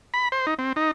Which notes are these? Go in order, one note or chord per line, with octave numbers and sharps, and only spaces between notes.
B5
C5
D#4
C4
D#4